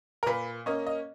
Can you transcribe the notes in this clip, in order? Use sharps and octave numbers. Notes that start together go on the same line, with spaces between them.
A#4
A#2 B4
A#3 C#4 D#5
D#5